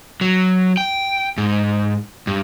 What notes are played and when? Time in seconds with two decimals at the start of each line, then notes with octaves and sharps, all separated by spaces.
0.21 F#3
0.77 G5
1.38 G#2
2.27 G2